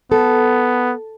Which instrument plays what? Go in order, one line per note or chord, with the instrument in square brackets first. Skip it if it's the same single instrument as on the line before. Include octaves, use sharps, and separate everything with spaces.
[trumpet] B3 [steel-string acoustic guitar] A4